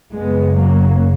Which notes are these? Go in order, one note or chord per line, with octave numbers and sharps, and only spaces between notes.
F#2 C#3 G#3 B3
F#3 A#3